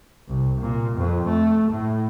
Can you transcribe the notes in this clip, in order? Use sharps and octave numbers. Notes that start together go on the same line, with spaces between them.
C2
A#2
F2
A3
A2